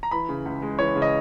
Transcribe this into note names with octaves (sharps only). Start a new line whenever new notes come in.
A#5
E3 B5
C#3
C#2
G#3
E3 C#5
C#3
D#5